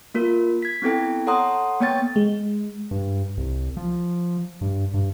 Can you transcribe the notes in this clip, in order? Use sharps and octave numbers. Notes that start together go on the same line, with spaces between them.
A#3 F4 A#4
G#6 B6
B3 C4 E4 A4 G5
A4 C#5 F#5 A#5 C6 D#6
A#3 B3 C#5 G5 A6
G#3
G2
C2
F3
G2
G2